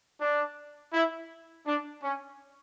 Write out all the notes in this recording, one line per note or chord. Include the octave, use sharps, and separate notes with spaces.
D4
E4
D4
C#4